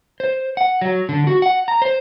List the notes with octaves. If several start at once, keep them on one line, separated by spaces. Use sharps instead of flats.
C5
F#5
F#3
D3
F#4
F#5
A#5
C5